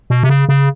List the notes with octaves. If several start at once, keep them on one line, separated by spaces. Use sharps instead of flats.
B2
C3
C#3
C#3